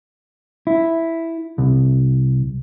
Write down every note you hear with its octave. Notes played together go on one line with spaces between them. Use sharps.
E4
C2